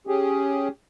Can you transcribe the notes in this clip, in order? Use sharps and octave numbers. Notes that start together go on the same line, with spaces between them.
C#4 G4 G#4